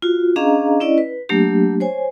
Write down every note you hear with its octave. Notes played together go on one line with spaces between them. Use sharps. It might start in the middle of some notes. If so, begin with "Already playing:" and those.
F4 F#4
C#4 D4 G#4 D#5 F5 A#5
C#4 E4 D5 D#5
B4
F#3 A3 A#3 D4 G4
C5 C#5 G#5